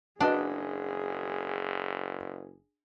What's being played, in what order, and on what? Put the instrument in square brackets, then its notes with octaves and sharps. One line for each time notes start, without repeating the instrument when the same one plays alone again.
[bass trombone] F#1 [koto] D4 [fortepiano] F#4 B4 D#5 [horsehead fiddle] G#4